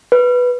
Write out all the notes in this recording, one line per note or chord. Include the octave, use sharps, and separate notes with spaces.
B4